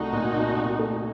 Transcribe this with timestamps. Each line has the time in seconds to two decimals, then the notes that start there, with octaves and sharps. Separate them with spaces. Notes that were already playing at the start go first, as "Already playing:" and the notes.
Already playing: C2 A3 D#4 F#4
0.12 A#2
0.35 C2
0.57 C2
0.79 A3